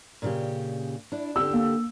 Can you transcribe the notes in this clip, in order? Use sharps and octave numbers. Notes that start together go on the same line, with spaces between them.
A#2 C#3 G4
D4 E4
D3 G4 E6
A#3